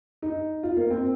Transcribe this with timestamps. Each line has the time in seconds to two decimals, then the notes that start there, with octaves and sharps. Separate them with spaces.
0.22 D#4
0.63 F4
0.77 A#3
0.90 C4